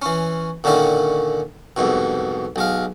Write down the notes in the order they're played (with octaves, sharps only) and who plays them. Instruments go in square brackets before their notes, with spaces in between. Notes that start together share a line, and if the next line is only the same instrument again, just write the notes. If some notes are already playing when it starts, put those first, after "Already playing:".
[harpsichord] E3 C#4
A#2 D3 D#3 C#4 E4
C2 F2 G#2 B2
B1 G#3 F5